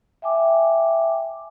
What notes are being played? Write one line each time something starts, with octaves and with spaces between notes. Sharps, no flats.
E5 G5 G#5 D6